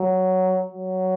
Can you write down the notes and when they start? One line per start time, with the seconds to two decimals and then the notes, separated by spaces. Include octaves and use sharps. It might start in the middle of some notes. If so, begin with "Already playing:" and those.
Already playing: F#3
0.72 F#3